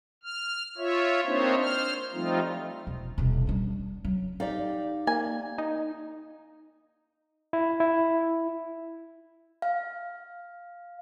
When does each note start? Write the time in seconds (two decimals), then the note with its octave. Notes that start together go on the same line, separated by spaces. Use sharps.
0.24 F6
0.78 F4 C#5 E5
1.25 A#3 C4 D4 D#4 C5 C#5
1.61 C5 F6
2.13 F3 G3 A3 C4 D#4 F4
2.87 E1
3.18 D#1 B2
3.47 G3 D4
4.05 F#3
4.40 D#4 G4 D5 F5
5.07 A#3 G#5
5.58 D#4
7.53 E4
7.80 E4
9.62 F5